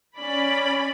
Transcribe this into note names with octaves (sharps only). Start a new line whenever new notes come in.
C#4 D5 B5